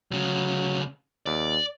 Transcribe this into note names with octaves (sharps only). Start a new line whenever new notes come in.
D2 C#3 F#3
D#2 D5